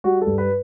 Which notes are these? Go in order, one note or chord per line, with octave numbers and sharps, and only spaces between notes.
G3 F#4
A4
G2
B4